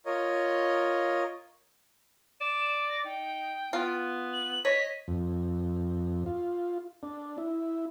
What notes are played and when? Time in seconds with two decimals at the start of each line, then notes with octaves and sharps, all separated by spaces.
0.06 F4 A#4 C#5 D#5
2.41 D5 E7
2.89 A#6
3.05 D#4 G5
3.73 B3 F4
4.33 F#7
4.65 C#5 D#5 B6
5.08 F2
6.26 F4
7.03 D4
7.38 E4